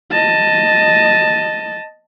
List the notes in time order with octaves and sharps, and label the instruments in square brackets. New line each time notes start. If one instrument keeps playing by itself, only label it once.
[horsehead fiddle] D#5 A5